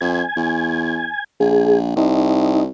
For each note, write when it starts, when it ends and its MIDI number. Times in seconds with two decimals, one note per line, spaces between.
0.01 0.23 41
0.01 1.24 80
0.36 1.08 40
1.40 1.95 34
1.40 1.80 68
1.96 2.69 36
1.96 2.64 63